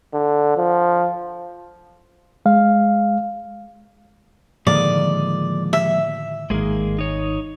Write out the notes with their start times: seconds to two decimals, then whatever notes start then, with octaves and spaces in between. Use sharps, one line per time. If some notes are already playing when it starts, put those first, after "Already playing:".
0.13 D3
0.57 F3
2.46 G#3 F5
4.67 A2 D3 D#3 F3 G#3 A#3 D5
5.73 E5
6.50 G#1 D#3 G#3 A#3 G#4
6.98 D#4 C#5